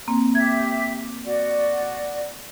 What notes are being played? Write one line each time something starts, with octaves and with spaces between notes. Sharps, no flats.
A#3 C4
G4 E5 G#6
F#4 D5